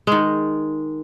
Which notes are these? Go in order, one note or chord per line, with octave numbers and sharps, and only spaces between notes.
D#3 G#3